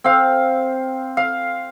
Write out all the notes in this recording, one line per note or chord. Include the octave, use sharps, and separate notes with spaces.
C4 F5
F5